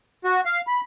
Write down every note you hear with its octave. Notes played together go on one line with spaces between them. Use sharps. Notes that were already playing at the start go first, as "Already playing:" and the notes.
F#4
F5
B5